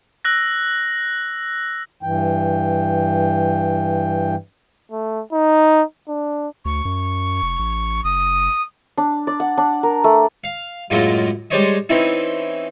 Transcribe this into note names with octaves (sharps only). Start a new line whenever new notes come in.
E6 F#6 A#6
G2 E3 G5
A3
D#4
D4
D2 C#6
F#2
F1
A1
F#1 D#6
D4
D5
F#5
D4
A#4
A3
F5
F#2 A2 F#3 G#3 A#3 F4
G3 G#3 D4 C5 C#5 D#5
E3 C4 C#4 D#4 E4